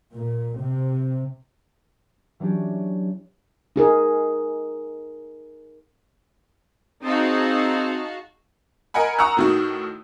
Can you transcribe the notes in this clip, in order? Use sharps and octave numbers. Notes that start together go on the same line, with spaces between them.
A#2
C3
E3 F#3 C#4 D4 G4
D#4 G#4 A#4
C4 D#4 F#4 G#4 F5 A5
A#4 D#5 F#5 G#5 B5
F#5 A#5 C#6 D#6 E6 F#6
A2 D#3 F#4